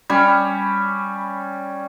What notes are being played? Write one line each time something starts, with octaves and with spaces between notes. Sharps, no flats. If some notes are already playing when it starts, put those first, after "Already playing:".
G3 C#4 C#5